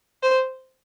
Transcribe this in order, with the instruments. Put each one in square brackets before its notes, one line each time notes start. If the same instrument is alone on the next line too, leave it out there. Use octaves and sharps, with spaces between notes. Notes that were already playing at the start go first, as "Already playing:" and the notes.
[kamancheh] C5